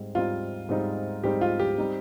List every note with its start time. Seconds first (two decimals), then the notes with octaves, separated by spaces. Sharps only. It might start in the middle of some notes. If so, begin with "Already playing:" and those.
Already playing: G#2 G3 C4
0.15 G#2 G3 C4 D#4 F4
0.69 G#2 G3 C4 D#4
1.24 G#2 G3 C4 D#4 G4
1.41 F4
1.60 G4
1.78 G3 C4 D#4